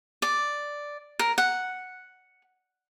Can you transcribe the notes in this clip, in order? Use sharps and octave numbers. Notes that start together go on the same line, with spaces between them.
D5
A#4
F#5